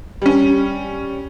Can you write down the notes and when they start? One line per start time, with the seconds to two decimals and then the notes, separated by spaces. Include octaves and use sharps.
0.22 G3 C#4